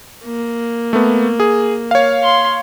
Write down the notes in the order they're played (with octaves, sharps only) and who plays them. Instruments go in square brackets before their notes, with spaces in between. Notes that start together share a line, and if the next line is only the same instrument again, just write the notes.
[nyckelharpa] A#3
[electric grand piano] A3 B3
G#4
C#5 F5
[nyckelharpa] C6